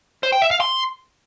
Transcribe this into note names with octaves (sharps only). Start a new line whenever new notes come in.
C5
G5
E5
F5
C6